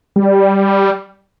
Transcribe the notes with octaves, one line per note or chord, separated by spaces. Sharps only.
G3